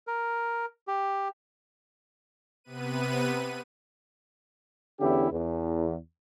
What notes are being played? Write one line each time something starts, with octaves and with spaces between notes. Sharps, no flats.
A#4
G4
C3 B3 B4 D#7
E2 D3 C#4 E4 G4
E2